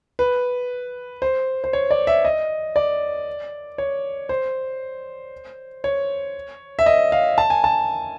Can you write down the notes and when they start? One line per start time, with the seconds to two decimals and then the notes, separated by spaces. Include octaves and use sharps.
0.19 B4
1.22 C5
1.64 C5
1.73 C#5
1.91 D5
2.07 E5
2.25 D#5
2.76 D5
3.78 C#5
4.29 C5
5.84 C#5
6.79 E5
6.86 D#5
7.12 F5
7.38 A5
7.50 G#5
7.64 A5